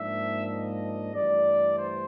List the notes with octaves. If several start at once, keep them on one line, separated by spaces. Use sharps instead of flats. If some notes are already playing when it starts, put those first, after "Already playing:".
Already playing: G#2 F3 A#3 D4 E5
D#5
G2 E3 A3 D5
C5